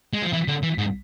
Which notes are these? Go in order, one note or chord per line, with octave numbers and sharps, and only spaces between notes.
G#3
F3
E3
D3
E3
G#2